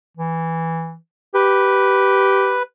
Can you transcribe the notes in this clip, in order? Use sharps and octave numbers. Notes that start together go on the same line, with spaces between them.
E3
G4 B4